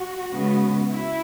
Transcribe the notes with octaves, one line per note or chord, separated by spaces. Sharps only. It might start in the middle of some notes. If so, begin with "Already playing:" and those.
Already playing: F#4
C#3 G#3 B3
E4